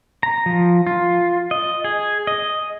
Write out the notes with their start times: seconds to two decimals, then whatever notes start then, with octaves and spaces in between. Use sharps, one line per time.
0.23 A#5
0.46 F3
0.87 F4
1.51 D#5
1.84 G#4
2.27 D#5